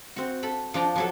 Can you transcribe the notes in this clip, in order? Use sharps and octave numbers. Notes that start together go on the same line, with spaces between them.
C4 F#4
A4 B5
F3 D4 G5 A#5
F3 F#3 A4